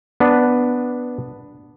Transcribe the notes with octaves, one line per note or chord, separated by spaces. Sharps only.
B3 D4 B4